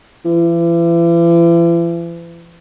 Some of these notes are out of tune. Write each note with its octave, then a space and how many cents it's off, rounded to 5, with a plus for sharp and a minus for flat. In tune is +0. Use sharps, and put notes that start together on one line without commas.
E3 +40